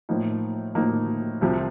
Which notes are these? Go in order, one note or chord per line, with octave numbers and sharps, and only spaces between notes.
A2 F3 A#3 D#4
A2 F3 A#3 D#4
C2 C3 F3